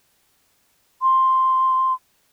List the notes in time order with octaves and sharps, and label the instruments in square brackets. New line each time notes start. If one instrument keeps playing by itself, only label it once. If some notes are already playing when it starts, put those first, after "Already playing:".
[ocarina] C6